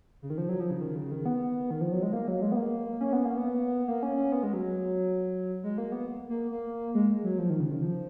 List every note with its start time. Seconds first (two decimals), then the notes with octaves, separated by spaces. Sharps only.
0.22 C#3
0.30 D#3
0.38 F3
0.49 F#3
0.60 F3
0.71 C#3
0.81 D#3
0.96 C#3
1.11 D#3
1.26 B3
1.71 D#3
1.81 F3
1.92 F#3
2.03 G#3
2.13 A#3
2.28 F#3
2.42 G#3
2.52 B3
2.56 A#3
3.01 C#4
3.13 B3
3.25 A#3
3.37 B3
3.88 A#3
4.03 C#4
4.17 C#4
4.32 B3
4.43 G#3
4.53 F#3
5.63 G#3
5.78 A#3
5.92 B3
6.29 A#3
6.51 A#3
6.95 G#3
7.23 F#3
7.39 F3
7.50 D#3
7.60 C#3
7.71 D#3
7.82 F3